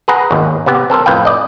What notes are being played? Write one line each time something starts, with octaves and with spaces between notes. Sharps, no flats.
G#4 B4 F#5 A#5
G#1 D#2
C3 B3 G4
C4 A4 A#4 C5
F2 A2 B4 F5 G5
D5 D#5